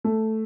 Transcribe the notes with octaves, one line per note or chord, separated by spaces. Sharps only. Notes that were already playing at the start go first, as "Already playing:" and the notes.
A3